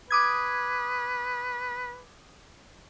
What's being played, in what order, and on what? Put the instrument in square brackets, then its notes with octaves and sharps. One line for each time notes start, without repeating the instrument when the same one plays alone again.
[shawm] B4 [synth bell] D6 D#6 G#6